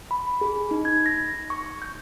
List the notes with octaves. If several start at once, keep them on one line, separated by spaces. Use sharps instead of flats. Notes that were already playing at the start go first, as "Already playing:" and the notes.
B5
G#4
D#4
G#6
A#6
C#6
G6